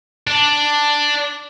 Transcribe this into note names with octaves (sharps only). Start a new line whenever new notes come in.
D4